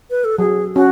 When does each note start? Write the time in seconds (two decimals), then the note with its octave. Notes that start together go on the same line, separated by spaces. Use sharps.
0.10 B4
0.25 A4
0.38 F#3 G#4
0.75 C#4 F#4